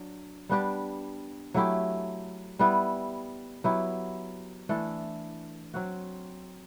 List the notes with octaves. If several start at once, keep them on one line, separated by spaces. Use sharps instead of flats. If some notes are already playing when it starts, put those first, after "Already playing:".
Already playing: F#3 D4
G3 B3 D4 G4
F#3 A3 E4 G4
G3 B3 E4
F#3 B3 E4 G4
E3 A3 D4 A4
F#3 C4 F#4